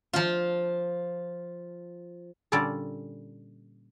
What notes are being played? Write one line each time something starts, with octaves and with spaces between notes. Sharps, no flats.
F3 F4
A#2 D3 G3 C#4 A4 D5